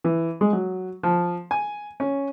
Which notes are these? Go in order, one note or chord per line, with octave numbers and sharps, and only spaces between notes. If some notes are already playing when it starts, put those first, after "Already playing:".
E3
G#3
F#3
F3
G#5
C#4